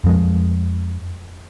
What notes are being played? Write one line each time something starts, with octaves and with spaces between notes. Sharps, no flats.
F2 F3 G#3